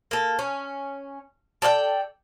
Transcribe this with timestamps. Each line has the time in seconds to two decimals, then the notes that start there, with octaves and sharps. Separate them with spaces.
0.11 A#3 A4
0.39 C#4
1.62 A4 D5 F5 G5